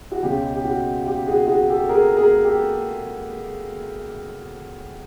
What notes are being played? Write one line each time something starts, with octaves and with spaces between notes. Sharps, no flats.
F#4
C#2 B2 G#3 C#4 G4
G4
F#4
G4
F#4 G#4
F#4 G#4
G4 A4
G#4 A#4
G#4 A#4
G4 A4